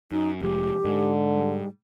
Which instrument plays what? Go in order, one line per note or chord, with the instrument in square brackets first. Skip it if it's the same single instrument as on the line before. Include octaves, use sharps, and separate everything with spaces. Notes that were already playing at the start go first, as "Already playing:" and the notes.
[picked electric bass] F#2 [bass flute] D#4
[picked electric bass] F1 F3 G#3 [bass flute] G4
[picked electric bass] G#2 G#3 [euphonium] D3
[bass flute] G3